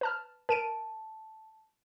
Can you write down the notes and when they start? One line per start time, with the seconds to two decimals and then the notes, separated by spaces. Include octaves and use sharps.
0.01 B4 A5 F6
0.49 A#4 A5 D7 D#7